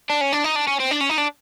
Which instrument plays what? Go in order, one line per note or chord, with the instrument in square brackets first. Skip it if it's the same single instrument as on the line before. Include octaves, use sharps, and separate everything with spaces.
[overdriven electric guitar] D4
C#4
D4
D#4
D4
C#4
C4
D4
C#4
D#4
D4